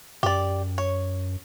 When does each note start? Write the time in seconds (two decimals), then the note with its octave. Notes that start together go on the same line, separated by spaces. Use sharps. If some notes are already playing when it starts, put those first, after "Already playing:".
0.23 F#2 G4 D5
0.78 C#5